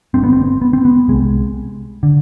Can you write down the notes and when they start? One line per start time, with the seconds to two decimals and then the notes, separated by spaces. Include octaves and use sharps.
0.14 G1 G2 D3 C4
0.24 B3
0.33 C4
0.62 B3
0.73 C4
0.85 B3
1.08 C2 C3 G#3
2.03 D3